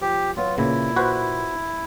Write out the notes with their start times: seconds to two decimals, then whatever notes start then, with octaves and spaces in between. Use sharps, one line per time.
0.01 F3 G4
0.37 F#3 B3 F4
0.58 A#2 C#3 E4
0.96 F#4 B4 C5